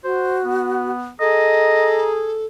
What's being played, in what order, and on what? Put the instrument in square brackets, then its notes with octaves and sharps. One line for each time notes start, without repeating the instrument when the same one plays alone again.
[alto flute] F#4 [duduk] C5
[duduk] B3
[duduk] G#4 [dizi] A4 [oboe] D#5 [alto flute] A#5